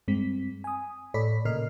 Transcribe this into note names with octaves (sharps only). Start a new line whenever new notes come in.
G2 G#3 C4 B6
G#5 D#6
A2 A4 C#5 D5 B5 B6
A#2 C#3 A#4 D#5 F6 C7